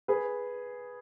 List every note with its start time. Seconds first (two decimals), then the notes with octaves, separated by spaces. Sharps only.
0.08 G#4 B4